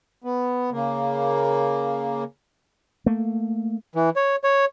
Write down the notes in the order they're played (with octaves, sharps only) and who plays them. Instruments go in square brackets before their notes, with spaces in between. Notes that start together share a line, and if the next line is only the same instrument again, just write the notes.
[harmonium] B3
C#3 A#3
[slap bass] A3 A#3
[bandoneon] E3
C#5
C#5